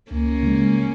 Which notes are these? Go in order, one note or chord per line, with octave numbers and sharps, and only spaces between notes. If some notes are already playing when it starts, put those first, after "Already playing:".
C#2 A#3 C#4
C#3 G#3